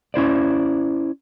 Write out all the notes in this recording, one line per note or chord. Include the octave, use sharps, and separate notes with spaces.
C#4 E4 C5 D5